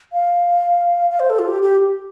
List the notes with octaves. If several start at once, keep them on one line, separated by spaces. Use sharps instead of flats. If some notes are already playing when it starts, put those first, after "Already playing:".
F5
F5
C5
A4
F4
G4
G4